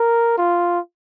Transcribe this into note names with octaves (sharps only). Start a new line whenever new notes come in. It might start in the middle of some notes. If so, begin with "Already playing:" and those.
Already playing: A#4
F4